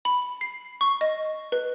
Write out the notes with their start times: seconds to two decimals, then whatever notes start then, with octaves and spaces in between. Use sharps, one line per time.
0.05 B5
0.41 C7
0.81 C#6
1.01 D#5
1.52 B4